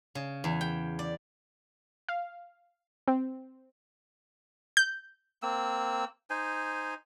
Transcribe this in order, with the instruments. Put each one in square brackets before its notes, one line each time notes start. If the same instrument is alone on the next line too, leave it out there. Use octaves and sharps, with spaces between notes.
[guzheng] C#3
E2
G5
D5
[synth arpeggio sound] F5
C4
G6
[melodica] A#3 C4 E6
D#4 C5 G#5